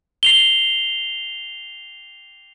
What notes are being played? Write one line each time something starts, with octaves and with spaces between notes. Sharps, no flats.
C7 F7 G7